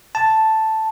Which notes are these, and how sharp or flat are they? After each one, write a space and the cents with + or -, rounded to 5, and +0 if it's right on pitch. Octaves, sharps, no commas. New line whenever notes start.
A5 +0